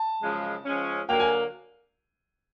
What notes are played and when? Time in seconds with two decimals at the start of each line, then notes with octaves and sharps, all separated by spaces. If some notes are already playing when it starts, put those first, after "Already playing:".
Already playing: A5
0.20 F#2 C#3 F3 G#3
0.65 F3 G#3 C#4
1.09 D3 F#3 A#3 G5
1.20 G#5